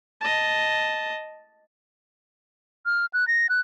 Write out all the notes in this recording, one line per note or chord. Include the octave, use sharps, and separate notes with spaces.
D#5 A5
F6
F#6
A#6
F#6